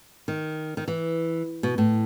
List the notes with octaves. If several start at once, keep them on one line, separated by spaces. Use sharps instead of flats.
D#3
D#3
E3
B2
A2